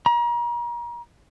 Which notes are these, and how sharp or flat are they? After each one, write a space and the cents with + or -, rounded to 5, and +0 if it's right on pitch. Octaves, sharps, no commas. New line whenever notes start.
A#5 +35